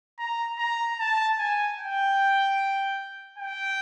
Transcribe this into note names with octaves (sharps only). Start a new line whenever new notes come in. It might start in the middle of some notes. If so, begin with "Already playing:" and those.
A#5
A#5
A5
G#5
G5
G5